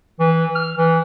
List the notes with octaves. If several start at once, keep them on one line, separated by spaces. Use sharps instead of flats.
E3
F6
E3